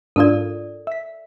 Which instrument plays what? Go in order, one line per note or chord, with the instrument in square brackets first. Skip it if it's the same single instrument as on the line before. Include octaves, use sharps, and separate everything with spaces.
[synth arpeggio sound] G#2 D4 F4 [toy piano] A4 A#4 D5
[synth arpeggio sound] E5 B6